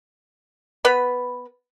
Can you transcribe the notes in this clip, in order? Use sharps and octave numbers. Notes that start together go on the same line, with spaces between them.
B3 B4 B5